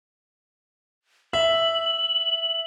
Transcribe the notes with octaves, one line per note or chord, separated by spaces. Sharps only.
E5 F#7